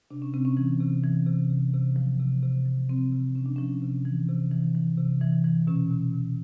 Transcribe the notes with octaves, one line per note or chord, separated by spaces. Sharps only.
C3 D4
C#4
C3 C4
C#4
E3
C3
E3
C3
C3
C3
F3
C3
C3
F3
C3 C4
C3
C3 C#4
D4
F3 C#4
C3
E3
C3
E3
E3
C3
E3
E3
B2 C#4
B2
B2